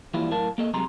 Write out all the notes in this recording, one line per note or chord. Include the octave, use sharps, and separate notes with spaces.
E3 F3 G3 A#3 E4 F4
F#2 A2 A#4 F5 A5
A#3 A4 D#5
C2 C3 F#3 G#3 A#5 C6